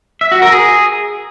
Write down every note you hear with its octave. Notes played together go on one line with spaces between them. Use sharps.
E5
F#4
A#4
G#4